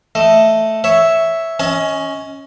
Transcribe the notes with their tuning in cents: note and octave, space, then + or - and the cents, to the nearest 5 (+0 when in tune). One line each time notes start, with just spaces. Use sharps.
A3 +0 D#5 +0
C#5 +5 E5 +0
C#4 +0 D#5 +35 G#5 +25